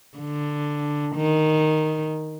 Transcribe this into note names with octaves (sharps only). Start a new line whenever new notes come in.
D3
D#3